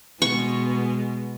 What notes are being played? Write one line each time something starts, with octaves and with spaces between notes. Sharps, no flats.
B2 G#3 B3 C#6